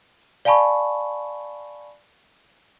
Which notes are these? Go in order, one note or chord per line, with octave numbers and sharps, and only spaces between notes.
D5 F5 G#5 A5 B5 C#6